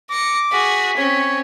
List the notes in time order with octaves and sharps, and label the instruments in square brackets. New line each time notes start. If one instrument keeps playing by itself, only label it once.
[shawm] D6 [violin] A#6 C#7
[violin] F#4 G#4 [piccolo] B6
[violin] C4 C#4 [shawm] C#5